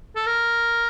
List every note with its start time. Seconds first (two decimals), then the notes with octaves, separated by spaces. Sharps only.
0.16 A4
0.26 A#4